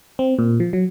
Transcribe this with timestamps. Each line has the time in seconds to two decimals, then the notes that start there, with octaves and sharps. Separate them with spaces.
0.19 C4
0.39 A#2
0.60 F3
0.73 F#3